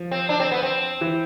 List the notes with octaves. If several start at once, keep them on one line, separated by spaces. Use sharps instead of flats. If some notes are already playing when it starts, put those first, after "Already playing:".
Already playing: F3
C4
D4
C4
B3
C4
E3